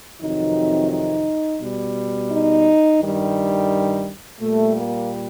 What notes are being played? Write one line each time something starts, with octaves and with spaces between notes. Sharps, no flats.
F2 C3 D#3 F#3 D#4
D#4
B2 G3
D#4
G2 D#3 G3
A#2 G3 A3
A#3